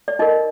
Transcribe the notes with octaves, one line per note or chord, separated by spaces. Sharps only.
D5
D#4 A#4 D#5